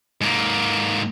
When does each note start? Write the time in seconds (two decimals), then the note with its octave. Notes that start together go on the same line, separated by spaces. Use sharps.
0.21 G#2 A#3